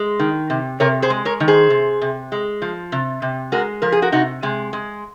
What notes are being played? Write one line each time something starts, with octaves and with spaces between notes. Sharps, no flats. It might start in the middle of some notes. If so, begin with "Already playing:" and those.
Already playing: G#3
D#3
C3
C3 A#4 C#5
G#4 C5
G#3
A#4 C#5
D#3
G#4 C5
C3
C3
G#3
F3
C3
C3
G#3 F#4 A#4
F3 A#4
G#4
F#4 A#4
C3 D#4 F#4
C3 G#3
G#3